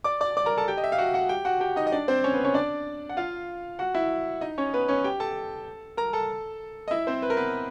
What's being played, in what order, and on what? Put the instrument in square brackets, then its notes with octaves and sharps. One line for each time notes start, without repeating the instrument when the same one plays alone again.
[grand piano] D5 D6
D5 D6
D5 D6
A#4 A#5
A4 A5
G4 G5
D#5
E5
F5
F#4 F#5
F#4 F#5
G4 G5
F#4 F#5
G4 G5
D#4 D#5
D#5
D4 D5
C4 C5
C#4 C#5
B3 B4
C#4 C#5
D4 D5
F#5
F4 F5
F#4 F#5
E4 E5
D#4 D#5
C#4 C#5
B3 B4
C#4 C#5
G4 G5
A4 A5
A#4 A#5
A4 A5
D#5
E4 E5
C4 C5
B4
A#4
B3 B4